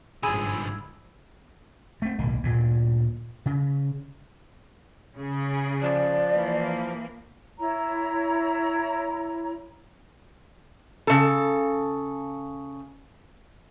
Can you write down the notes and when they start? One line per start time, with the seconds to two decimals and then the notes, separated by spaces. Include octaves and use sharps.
0.23 G1 G#2 D3 F3 G#4 B5 E6 G#6
2.02 A3 C4
2.19 D1 B1 D#3 A#3
2.43 D2 G2 A#2
3.46 C#3
5.16 C#3 G#4
5.82 F3 D5
6.31 E3 A#3
7.59 E4 C#5 A#5
11.07 C#3 A4